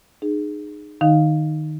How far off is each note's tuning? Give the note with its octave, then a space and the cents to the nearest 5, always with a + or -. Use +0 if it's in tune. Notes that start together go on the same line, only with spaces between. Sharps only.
D#4 -35 G#4 +0
D#3 -20 D#4 -5 F5 +0